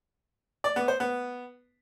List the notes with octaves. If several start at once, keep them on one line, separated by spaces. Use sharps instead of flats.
D5
B3
C5
B3